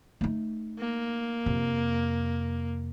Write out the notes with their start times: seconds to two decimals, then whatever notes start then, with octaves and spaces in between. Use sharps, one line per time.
0.21 A3 D#4
0.79 A#3
1.46 F2 C3